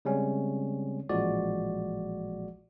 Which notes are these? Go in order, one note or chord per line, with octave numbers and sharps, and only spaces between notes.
C#3 G3 G#3 C4 C#4
A1 A#2 F3 G#3 F#4 D5